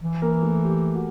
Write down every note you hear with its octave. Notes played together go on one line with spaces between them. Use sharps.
E3
A#3 A#4
A3 A4
G4
F#4